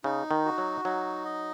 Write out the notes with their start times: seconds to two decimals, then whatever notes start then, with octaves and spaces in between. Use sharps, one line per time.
0.04 C#3 D#4
0.31 D#3
0.45 F#4
0.58 F#3
0.85 F#3 D#4
1.25 D#5